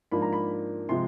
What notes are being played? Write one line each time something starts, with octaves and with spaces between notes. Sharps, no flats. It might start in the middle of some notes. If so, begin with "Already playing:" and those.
G#2 F3 A#3 D4 B5
A#5
B5
C3 F3 G#3 C6